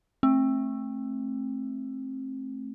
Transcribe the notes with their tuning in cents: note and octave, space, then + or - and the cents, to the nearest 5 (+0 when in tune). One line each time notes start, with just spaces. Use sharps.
A3 -5 C4 +25